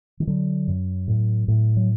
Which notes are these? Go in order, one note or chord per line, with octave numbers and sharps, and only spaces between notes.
D#3
D3 F#3
F#2
A2
A2
F#3